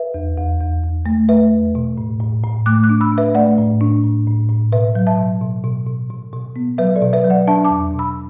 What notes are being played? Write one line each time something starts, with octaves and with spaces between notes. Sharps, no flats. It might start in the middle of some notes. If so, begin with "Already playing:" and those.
Already playing: B4 E5
E2
E2
E2
E2
A3
A3 B4 E5
E2
B2
A2
A2
A2
A3 D6 F#6
D6 F#6
D4
B5 E6
D4
B4 E5
A3 D5 F#5
A2
D4
A2
A2
A2
B2 B4 E5
F#3
E5 A5
B2
B2
B2
B2
B2
B2
B3
F#3 B4 E5
A4 D5
B2
B4 E5
F#3
D5 F#5
D4 E5 A5
A5 D6
E2
B2
B5 E6